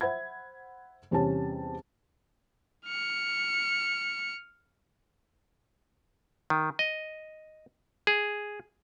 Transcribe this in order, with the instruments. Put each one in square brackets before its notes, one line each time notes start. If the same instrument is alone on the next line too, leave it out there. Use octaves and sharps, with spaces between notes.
[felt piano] C5 E5 F#5 B5 G#6
E2 C3 G3 C#4 A5
[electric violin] F6 C#7
[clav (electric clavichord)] D#3
D#5
G#4